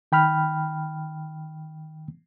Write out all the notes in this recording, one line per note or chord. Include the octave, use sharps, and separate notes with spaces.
D#3 G5 B5 F6